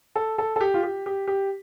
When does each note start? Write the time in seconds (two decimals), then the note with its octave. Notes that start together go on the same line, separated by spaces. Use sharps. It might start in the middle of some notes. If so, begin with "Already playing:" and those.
0.16 A4
0.38 A4
0.56 A4
0.61 G4
0.74 F4
0.83 G4
1.06 G4
1.27 G4